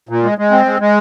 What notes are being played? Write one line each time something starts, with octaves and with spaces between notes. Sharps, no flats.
A#2
G#3
G#3
C4
G#3
G#3